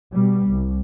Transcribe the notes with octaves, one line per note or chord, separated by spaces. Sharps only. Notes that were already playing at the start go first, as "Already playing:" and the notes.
B2 G3
C2